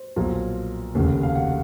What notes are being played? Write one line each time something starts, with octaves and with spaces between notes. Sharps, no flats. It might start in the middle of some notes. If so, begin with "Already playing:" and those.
Already playing: C5
B1 A#2 F3
F1 D#2 C#3
F5
F#5